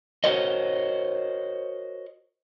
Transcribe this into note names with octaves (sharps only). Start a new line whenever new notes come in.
F#4 A#4 C5 C#5 D#5